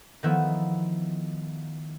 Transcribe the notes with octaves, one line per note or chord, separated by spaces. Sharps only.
D#3 F3 A3 B3 E4